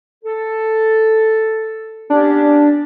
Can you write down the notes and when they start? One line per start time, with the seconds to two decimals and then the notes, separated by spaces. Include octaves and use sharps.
0.24 A4
2.10 B3 C#4 D4 G4